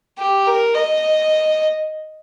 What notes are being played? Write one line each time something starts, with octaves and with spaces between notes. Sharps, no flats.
G4
A#4
D#5